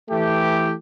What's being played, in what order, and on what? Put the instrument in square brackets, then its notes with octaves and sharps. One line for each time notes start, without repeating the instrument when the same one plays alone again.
[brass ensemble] E3 A3 G4